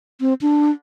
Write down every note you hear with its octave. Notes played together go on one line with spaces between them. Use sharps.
C4
D4